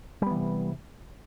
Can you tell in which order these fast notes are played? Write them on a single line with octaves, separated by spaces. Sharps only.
G3 B3 E3 C3